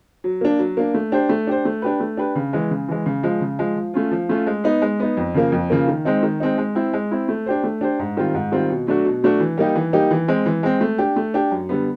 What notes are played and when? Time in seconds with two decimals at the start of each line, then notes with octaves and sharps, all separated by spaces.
0.24 F#3
0.41 A#3 D4
0.59 F#3
0.77 A#3 D4
0.94 A3
1.12 D4 G4 C5
1.29 A3
1.47 D4 G4 C5
1.65 A3
1.82 D4 G4 B4
2.00 A3
2.17 D4 G4 B4
2.35 C#3
2.53 E3 G#3
2.71 C#3
2.88 E3 G#3
3.06 C#3
3.23 F3 G#3
3.41 C#3
3.59 F3 G#3
3.76 F3
3.94 A3 C#4 F4
4.11 F3
4.29 A3 C#4 F4
4.47 G#3
4.64 B3 D#4
4.82 G#3
5.00 B3 D#4
5.17 F2
5.34 C#3 F3 A#3
5.52 F2
5.70 C#3 F3 A#3
5.88 D#3
6.05 G#3 C4 D#4
6.23 D#3
6.40 G#3 C4 D#4
6.58 G#3
6.75 C4 E4
6.93 G#3
7.11 C4 E4
7.29 A3
7.46 D4 G4 C5
7.64 A3
7.81 D4 G4 C5
7.99 G#2
8.17 D#3 G3 C4 F4
8.35 G#2
8.52 D#3 G3 C4 F4
8.69 B2
8.87 F#3 A3 D4 F#4
9.05 B2
9.22 F#3 A3 D4 F#4
9.40 E3
9.58 G3 A#3 D#4 G4
9.75 E3
9.93 G3 A#3 D#4 G4
10.11 E3
10.28 G#3 C4
10.46 E3
10.63 G#3 C4
10.81 A3
10.98 D4 G4
11.16 A3
11.34 D4 G4
11.51 F#2
11.69 D3 G3 B3